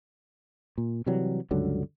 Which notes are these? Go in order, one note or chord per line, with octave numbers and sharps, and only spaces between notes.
A#2
C3 E3 F#3 G3
C#2 G2 D3 F#3